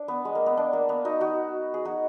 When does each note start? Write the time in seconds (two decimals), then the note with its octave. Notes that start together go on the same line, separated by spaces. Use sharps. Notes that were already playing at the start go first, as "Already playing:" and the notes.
Already playing: D4
0.08 B3
0.25 G#3
0.35 A#3
0.46 B3
0.57 D4
0.73 A#3
0.89 B3
1.05 D#4 F#4
1.21 D#4 F#4
1.74 G#4
1.85 D#4 F#4